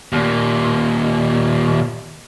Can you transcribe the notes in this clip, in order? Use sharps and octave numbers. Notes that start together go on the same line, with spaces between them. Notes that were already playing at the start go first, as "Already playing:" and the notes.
D#2 A#2